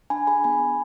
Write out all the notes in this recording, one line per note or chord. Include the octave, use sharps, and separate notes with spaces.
D4 G#5 B5
G#4 G#5 B5
B3 G#5 B5
B3